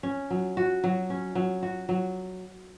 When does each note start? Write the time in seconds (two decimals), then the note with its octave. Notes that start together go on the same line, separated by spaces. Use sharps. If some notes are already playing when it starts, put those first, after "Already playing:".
0.03 C#4
0.30 F#3
0.57 F#4
0.84 F#3
1.10 C#4
1.35 F#3
1.63 F#4
1.89 F#3